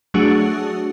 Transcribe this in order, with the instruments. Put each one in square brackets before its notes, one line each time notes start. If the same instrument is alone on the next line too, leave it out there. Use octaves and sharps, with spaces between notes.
[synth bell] F#3 A3 D4 F#4 G#4